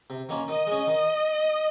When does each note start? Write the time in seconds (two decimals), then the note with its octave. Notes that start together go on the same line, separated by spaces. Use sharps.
0.10 C3
0.29 D#3 A#3 C#4 F4
0.48 D#3 D#5
0.67 G#3 C#4
0.87 D#3